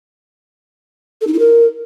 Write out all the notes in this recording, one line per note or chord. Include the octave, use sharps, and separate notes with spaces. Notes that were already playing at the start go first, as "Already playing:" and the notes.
A4
D#4
E4
A#4